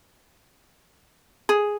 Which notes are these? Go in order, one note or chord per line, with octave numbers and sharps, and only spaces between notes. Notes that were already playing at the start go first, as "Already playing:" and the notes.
G#4